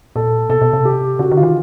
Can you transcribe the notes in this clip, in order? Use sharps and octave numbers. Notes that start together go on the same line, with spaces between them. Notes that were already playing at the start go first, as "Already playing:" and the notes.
A#2 A4
B2 A4
B2
C3
G4
C#3 F#4
D3
F4
D#3